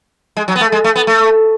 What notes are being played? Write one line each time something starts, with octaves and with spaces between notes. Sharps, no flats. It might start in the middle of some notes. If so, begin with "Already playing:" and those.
G#3
F#3
B3
A3
G#3
A3
B3
A3